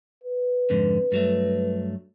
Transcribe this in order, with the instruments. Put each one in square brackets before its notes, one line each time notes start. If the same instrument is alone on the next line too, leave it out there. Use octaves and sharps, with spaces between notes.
[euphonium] B4
[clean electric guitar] F2 G#2 D3
G2 F#3 A3